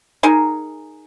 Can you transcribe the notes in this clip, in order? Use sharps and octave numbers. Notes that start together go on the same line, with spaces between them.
D#4 G#4 A#4